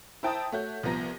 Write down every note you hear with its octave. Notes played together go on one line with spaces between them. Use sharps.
E4 C5 G5 A5 A#5 D#6
A3 F#4 C#5 G6
C2 F3 B3 A#5 A#6